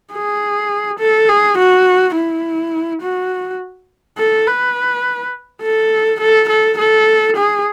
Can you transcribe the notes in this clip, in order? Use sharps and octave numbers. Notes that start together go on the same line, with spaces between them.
G#4
A4
G#4
F#4
E4
F#4
A4
B4
A4
A4
A4
A4
G#4